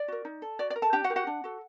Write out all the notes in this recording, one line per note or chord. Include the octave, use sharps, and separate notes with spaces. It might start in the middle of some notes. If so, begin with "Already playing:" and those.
Already playing: D5
F#4 A#4
D#4
A4
F#4 D5
D5
A#4
A4 A5
D4 G4 G5
F#4 F#5
G4 A#4
F#4 F#5
D4
F#4 A4